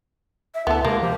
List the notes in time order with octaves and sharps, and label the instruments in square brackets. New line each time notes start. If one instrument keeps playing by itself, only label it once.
[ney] E5
[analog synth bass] D2 [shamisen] B3 A4 [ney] E4
[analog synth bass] C3 [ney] G#3 [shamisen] A#3
[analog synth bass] F3 [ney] G4